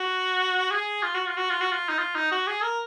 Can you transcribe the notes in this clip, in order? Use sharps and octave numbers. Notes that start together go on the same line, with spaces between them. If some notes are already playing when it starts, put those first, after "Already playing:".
Already playing: F#4
G#4
F4
F#4
F4
F#4
F4
F#4
F4
D#4
F4
D#4
F#4
G#4
A#4